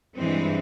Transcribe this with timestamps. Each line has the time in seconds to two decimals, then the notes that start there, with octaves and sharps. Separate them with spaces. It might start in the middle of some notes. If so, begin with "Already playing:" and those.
0.16 G2 E3 G#3 C4